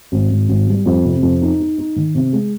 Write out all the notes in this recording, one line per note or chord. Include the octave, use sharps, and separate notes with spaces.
G#1
G#1
G#1
G3
F2
C3
F2
D#4
D#4
D#4
D#3
C3
G#3